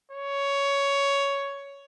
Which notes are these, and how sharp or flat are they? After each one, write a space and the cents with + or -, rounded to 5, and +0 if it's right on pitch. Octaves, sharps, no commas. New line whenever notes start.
C#5 +10